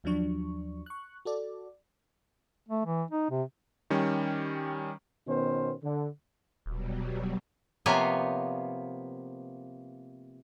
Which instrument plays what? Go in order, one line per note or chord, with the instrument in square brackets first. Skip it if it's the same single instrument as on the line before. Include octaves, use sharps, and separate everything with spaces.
[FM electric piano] D#2 F3 F#3 D4 C#6
C#6 F#6
F#4 A4 D5
[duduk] A3
E3
D#4
C3
[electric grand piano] D#3 G3 C#4
[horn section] B2 D#3 B3 C#4 C5
D3
[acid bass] D#1 [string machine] B2 F#3 G3
[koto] C3 F3 A#3 B3 C#5 G#5